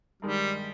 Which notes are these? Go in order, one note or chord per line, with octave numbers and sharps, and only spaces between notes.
G2 D#3 G3 G#3 D#4